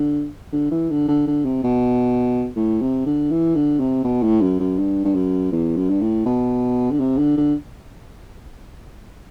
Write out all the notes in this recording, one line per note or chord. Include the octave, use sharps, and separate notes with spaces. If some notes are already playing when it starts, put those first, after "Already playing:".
Already playing: D3
D3
E3
D3
D3
D3
C3
B2
A2
C3
D3
E3
D3
C3
B2
A2
F#2
F#2
G2
G2
F#2
E2
F#2
G2
A2
B2
D3
C3
D3
D3